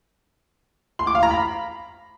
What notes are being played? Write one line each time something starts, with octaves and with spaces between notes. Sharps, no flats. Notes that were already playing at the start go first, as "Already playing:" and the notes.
C6
D6
F5
A#5
B5